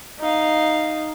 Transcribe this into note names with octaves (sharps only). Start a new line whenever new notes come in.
D#4 F5